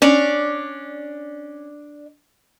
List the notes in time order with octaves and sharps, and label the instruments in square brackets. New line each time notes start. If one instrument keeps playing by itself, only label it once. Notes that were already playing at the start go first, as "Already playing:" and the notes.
[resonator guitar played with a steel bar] C#4 [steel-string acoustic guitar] D4 D5